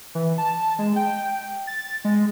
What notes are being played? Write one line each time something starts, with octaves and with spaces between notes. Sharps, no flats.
E3
A5
G#3
G5
A6
G#3